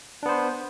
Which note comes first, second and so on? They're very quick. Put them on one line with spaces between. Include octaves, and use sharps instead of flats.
D4 B3 C5